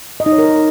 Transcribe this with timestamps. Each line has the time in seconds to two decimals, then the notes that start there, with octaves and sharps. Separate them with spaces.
0.20 D#5
0.26 D#4
0.32 C#5
0.38 A#4